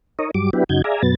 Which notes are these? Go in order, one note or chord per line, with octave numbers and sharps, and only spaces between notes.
D#4 A#4 C#5 D#5
G2 F#3 G3 D6
F#3 B3 D4 E4 G4 B4
F#2 C#3 D#4 F#4 G6 G#6
G#4 D5 E5 F5 G#5 A#5
F#2 B2 F#3 B3 A6